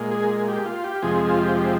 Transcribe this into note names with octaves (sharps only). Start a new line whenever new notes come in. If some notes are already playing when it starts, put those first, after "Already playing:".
Already playing: A#2 G#3
G#4
G4
F4
G4
F2 C3 F3 G#3 G#4
G#4
F4
G4
G4